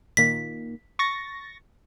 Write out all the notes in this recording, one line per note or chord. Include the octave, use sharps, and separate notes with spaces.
A#2 D#3 A#3 B6
C#6 A6 A#6